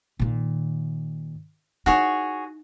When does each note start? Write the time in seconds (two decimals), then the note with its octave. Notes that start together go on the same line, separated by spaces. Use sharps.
0.19 A#2 D#3
1.86 D#4 E4 F#4 G#4 C#5